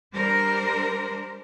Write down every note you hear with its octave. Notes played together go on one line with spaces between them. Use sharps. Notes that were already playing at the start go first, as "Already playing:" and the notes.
G3 D4 A#4 C5